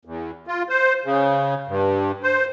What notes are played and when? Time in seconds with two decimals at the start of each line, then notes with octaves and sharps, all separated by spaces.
0.05 E2
0.47 F4
0.69 C5
1.05 C#3
1.68 G2
2.23 C5